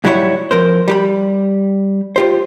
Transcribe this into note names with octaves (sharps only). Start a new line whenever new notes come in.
G#2 F#3 G3 E4 C5 C#5
F2 A#4 C5
G3 G4 B5
F4 G4 C5